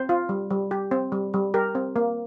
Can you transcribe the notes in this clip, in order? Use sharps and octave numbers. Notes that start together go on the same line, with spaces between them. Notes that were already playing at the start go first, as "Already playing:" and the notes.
Already playing: C4 C5
F4
G3
G3
G4
C4
G3
G3
G4 A#4
C4
A#3